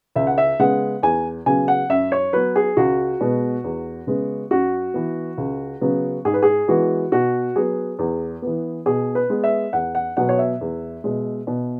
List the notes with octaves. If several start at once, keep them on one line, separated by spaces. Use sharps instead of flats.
C#2 E5
F#5
E5
C#3 G#3 B3 F#5
E2 G#5
C#3 F#3 B3 G#5
F#5
F#2 E5
C#5
F#3 B3 B4
G#4
C#2 F#4
B2 G#3 B3
E2
C#3 G#3 B3
F#2 F#4
E3 B3
C#2
C#3 F#3 B3
G#2 G#4
B4
G#4
E3 G#3 B3 F#4
B2 F#4
F#3 B3 G#4
E2
E3 B3
B2 G#4
B4
G#3 B3
E5
E2 F#5
F#5
B2 F#3 B3 F#5
C#5
E5
E2
B2 G#3
B2